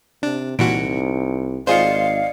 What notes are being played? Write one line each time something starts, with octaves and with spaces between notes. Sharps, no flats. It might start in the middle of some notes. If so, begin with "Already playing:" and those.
C3 D4
C2 A#2 E3 D#4 F#4 C#7 D7
G#1 F4 G#4 C5 D5 D#5 F5 C#7